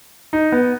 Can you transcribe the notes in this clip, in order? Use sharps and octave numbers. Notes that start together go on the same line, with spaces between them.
D#4
B3